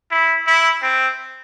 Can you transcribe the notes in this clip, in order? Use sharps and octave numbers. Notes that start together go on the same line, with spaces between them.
E4
E4
C4